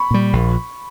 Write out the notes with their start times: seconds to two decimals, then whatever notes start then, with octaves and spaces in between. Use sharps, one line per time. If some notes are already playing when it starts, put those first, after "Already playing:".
Already playing: B5 C#6
0.11 A#2 G3
0.33 A#1